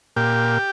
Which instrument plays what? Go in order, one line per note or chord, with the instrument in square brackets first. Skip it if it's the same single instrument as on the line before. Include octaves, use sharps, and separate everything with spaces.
[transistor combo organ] A#2 G4